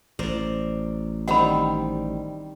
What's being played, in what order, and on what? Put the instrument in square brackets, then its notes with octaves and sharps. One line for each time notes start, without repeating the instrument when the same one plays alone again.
[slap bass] A1 [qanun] A#4 C5 D5
[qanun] D#3 G3 C4 [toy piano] F#5 B5